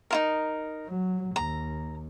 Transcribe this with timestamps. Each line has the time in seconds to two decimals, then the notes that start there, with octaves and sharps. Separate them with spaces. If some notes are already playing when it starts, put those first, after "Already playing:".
0.11 D#4 F4 A#4
0.87 F#3
1.36 D#2 A#5